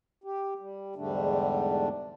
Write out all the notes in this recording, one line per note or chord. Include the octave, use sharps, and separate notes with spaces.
G4
G3
E2 G#2 D3 G3 A3 D4